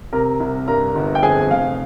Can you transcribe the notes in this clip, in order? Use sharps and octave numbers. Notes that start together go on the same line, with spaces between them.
C3 A#4 A#5
C2
G2 A#4 A#5
G1
G5
F2 G#4 G#5
F1 F5